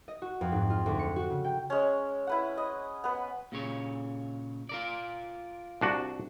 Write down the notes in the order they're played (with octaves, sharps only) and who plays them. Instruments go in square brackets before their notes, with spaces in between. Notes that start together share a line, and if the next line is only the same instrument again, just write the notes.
[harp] D#5
F#4
F2
G#2
F4
D2
C#7
F#4
C#3
G5
[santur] G#3 C#4
E4 B4 F#5
D#5
B3 B4
[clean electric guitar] A#2 C#3 C#5
F4 A#4 D5
[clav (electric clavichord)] C2 D4 F#4